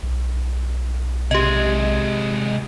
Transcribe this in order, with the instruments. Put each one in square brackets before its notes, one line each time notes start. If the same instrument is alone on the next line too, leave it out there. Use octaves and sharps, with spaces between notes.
[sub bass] B1
[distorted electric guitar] C3 G#3 [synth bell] G4 D#5